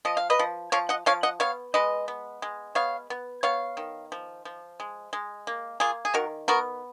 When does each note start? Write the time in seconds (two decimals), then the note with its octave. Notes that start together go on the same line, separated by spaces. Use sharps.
0.05 F3 D#5
0.17 F5
0.30 B4 D#5
0.39 F3
0.72 F3 C#5 F5
0.89 D#5 F#5
1.06 F3 C#5 F5
1.23 D#5 F#5
1.40 B3 C#5 F5
1.74 G#3 B4 D#5
2.08 B3
2.42 G#3
2.75 B3 C#5 F5
3.10 B3
3.43 B3 C#5 F5
3.77 D#3
4.12 F3
4.45 F3
4.80 G#3
5.13 G#3
5.47 A#3
5.80 A#3 F4 G#4
6.05 G#4
6.14 D#3 F#4 A#4
6.48 B3 F#4 A#4